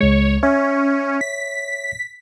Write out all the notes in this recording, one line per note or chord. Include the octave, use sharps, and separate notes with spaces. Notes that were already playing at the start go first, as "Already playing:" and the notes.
C#2 G#3 C#5
C#4 C#5 E5
B6